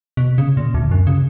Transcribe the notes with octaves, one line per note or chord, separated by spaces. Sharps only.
B2
C#3
A#2
D2
F#2
C#3